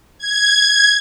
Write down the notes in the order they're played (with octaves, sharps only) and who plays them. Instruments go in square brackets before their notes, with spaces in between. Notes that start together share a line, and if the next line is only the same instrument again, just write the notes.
[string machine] G#6